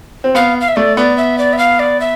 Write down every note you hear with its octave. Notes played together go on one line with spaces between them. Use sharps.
C4
B3 F5
F5
E5
A3 D5
B3 D5
E5
D5
E5
F5
D5
E5